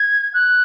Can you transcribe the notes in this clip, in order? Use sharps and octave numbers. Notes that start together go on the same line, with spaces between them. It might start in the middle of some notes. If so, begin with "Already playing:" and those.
Already playing: G#6
F#6